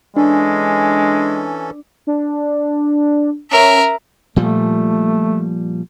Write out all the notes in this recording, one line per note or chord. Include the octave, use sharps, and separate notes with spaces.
E3 G#3 C#4 D4 A4
D4
C#4 A#4 E5
A#2 F3 G3 A3